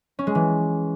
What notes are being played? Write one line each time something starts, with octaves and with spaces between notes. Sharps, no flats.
C#4
G#3
E3